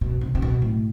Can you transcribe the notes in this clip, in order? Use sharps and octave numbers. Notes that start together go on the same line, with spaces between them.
B2
C3
C3
B2
A2